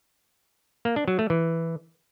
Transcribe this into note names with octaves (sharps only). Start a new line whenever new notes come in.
A#3
D4
F#3
A3
E3